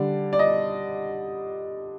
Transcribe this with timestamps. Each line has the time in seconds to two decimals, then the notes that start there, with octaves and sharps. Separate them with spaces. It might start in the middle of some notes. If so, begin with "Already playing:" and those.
Already playing: D3 G3 D4 D5
0.33 D5
0.39 D#5